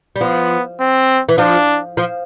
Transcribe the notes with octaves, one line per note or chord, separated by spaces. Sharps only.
G3
F3 B3
C4
E3
F3 D4
F3